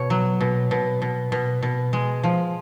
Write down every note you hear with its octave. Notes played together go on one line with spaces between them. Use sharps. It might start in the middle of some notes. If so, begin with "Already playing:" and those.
Already playing: B2 C#5
F#3
B2
B2
B2
B2
B2
G#3
F3